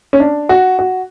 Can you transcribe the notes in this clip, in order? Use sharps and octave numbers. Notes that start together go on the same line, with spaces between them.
C#4
D4
F#4
F#4